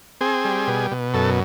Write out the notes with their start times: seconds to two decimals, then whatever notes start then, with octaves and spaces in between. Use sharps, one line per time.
0.21 C4 G#4
0.45 G3
0.67 B2
0.91 B2
1.14 F#2 A4